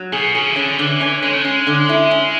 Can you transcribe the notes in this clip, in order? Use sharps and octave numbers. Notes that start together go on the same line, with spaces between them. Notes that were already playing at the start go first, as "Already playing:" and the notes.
Already playing: F#3
B2 G#4
C#3 G#4
E3
D3 C#4
D3 E3
C#4
G#3 C#4
A3
G#3 C#4
D3
E4
C#4